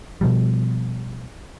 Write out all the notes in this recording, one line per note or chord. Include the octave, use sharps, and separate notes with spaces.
B2 F3 G3